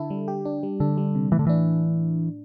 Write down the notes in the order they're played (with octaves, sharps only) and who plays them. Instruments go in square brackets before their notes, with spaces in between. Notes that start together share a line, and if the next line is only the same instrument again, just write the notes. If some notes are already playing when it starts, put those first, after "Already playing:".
Already playing: [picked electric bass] D3 [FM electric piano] E4 A4
[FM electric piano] G3
G4
D4
G3
[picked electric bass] D3 [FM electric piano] D4
[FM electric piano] G3
C3
[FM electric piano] A2 [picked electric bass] E3
[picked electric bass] D3
[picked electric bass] E3 [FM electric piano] D4